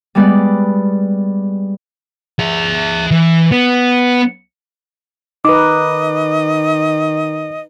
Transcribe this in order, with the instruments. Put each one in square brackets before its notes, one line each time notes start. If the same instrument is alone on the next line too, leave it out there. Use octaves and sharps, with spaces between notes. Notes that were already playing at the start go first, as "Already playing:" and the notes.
[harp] G3 G#3 B3 B4 D5
[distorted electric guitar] G#4 E5
E3
B3
[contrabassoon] D#3 [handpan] D#4 B4 [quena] D#5 [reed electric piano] D6